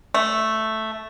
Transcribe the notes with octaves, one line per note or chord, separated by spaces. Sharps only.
A3